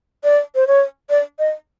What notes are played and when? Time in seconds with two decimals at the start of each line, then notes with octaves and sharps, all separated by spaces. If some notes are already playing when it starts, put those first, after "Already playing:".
0.24 D5
0.55 C5
0.67 C#5
1.10 D5
1.39 D#5